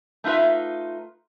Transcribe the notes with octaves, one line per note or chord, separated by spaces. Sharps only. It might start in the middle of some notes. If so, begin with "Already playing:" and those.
A3 D#4 F4 B4 E5